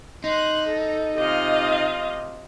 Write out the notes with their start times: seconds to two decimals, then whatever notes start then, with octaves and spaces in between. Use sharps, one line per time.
0.24 D#4 C6 F#6
0.67 A4
1.17 C3 F4 D#5 F5